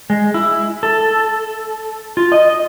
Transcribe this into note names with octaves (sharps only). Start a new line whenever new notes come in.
G#3
E4
A4
F4
D#5